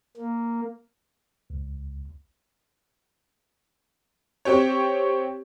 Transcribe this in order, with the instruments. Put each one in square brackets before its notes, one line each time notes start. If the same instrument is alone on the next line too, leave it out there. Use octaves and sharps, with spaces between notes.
[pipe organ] A#3
[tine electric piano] C#2
[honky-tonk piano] C4 G4 C#5